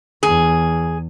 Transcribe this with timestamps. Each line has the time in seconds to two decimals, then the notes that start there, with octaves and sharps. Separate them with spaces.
0.23 E2 G#4